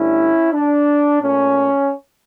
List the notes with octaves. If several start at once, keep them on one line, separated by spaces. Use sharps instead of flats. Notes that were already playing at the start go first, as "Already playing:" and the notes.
Already playing: G2 D3 A3 C#4 E4
D4
A#2 A3 C#4